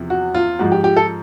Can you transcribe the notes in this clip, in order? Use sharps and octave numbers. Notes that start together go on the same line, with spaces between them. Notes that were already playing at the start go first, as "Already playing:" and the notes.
Already playing: E2 C3 F3
F#4
F4
G#2 F3 F#4
G4
G4
A4